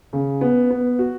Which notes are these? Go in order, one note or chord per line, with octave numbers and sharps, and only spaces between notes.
C#3
B3
B3
F#4